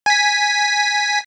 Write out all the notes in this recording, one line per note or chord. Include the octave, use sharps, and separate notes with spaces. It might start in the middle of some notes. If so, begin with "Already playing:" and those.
G#5 B6